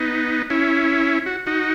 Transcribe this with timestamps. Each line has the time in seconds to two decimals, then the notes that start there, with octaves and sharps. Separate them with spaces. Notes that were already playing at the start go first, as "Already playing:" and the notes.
Already playing: B3 D#4
0.50 C#4 E4
1.26 F#4
1.46 D#4 F#4